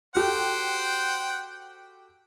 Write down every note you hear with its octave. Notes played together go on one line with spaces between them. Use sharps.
F#4 G4 A4 C5 F#5 G5